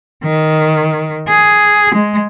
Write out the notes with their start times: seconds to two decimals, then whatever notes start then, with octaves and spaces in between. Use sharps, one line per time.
0.24 D#3
1.28 G#4
1.94 G#3